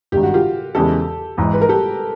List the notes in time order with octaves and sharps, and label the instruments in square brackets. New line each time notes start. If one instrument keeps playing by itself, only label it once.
[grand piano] G#1 G2 D#3 [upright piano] G4
[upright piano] F#4
F4 G4
[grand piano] E2 C#3 E3 G#3 [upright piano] G4 A4
[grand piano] G#1 G#2 E3
[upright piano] B4
A#4
G4 A4